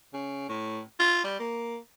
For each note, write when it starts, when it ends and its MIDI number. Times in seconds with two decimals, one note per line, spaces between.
0.14 0.45 49
0.49 0.80 45
1.00 1.20 65
1.24 1.38 55
1.40 1.78 58